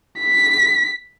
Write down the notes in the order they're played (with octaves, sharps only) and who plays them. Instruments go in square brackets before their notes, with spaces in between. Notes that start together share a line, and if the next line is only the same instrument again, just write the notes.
[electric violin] B6